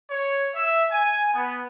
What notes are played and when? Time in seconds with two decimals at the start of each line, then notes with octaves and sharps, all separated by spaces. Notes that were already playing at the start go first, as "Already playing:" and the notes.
0.11 C#5
0.55 E5
0.92 G#5
1.34 B3